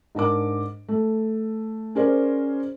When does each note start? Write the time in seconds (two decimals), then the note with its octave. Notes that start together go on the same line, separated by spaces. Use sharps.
0.15 G#2 D4 A#4 D6
0.89 A3
1.95 C#4 G#4 A#4 C5 D5